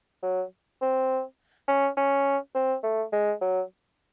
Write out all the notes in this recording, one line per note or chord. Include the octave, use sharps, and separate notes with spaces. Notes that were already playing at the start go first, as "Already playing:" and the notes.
F#3
C4
C#4
C#4
C4
A3
G#3
F#3